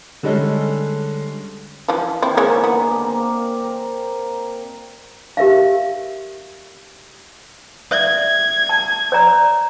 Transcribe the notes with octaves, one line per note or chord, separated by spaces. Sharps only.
D3 G3 G#3 C#4 A4
E3 F3
D3 D#3 A#3 C4 E4
E3 G#3 A#4 C5 C#5
B3 D4 F4 G#5
A#3 C4
A#4 G5
G4 A#4 E5 F5
D5 E5 G#6
A5
C#5 D5 A#5